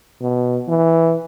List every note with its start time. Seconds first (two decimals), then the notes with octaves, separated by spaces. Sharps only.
0.21 B2
0.68 E3